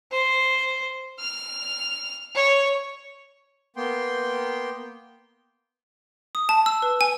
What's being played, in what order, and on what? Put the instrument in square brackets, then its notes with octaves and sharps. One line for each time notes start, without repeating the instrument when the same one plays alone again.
[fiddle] C5
F6
C#5
[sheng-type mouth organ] A#3 B3 G5 C6
[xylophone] D#6
A5
E6
B4
G#5